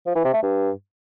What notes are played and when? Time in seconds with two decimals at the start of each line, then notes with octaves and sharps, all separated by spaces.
0.07 F3
0.16 E3
0.25 C3
0.34 A3
0.43 G2